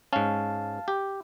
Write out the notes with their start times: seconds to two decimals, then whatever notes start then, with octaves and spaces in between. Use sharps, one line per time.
0.13 G#2 C#4 F5 A5
0.88 G4